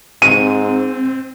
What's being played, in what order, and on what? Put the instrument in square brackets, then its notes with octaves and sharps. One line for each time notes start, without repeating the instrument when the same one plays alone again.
[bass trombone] G#2 [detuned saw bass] C4 [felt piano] D#7